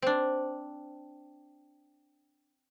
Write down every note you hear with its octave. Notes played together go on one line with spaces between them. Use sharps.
C4 D4